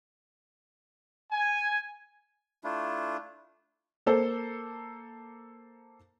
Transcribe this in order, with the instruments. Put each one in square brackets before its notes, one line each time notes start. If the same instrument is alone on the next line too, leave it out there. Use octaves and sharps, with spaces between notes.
[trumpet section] G#5
[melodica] A3 D4 E4 F4
[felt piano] A#3 A4 C5